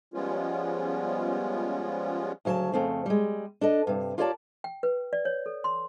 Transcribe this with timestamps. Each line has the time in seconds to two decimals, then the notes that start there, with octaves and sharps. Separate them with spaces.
0.14 F3 G3 G#3 B3 C#4 F4
2.45 D2 C#3 F#3 G#4 A5
2.73 F2 C#3 A3 C4
3.06 G3 G#3
3.61 D4 A4 D#5
3.87 G2 C3
4.18 F4 G4 A#4 C#5 D5 A5
4.64 G5
4.83 B4
5.13 D5
5.25 C#5
5.46 A4
5.64 C6